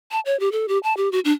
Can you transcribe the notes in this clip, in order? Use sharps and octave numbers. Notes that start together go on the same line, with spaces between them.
A5
C#5
G4
A4
G4
A5
G4
F#4
D4